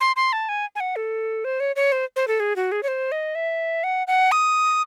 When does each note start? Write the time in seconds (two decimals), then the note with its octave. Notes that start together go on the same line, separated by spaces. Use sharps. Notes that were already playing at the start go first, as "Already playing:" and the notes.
0.01 C6
0.16 C6
0.33 A5
0.49 G#5
0.75 G#5
0.80 F#5
0.96 A4
1.44 C5
1.60 C#5
1.76 C#5
1.92 C5
2.16 C5
2.28 A4
2.40 G#4
2.56 F#4
2.72 G#4
2.83 C#5
2.88 C5
3.12 D#5
3.35 E5
3.84 F#5
4.07 F#5
4.32 D#6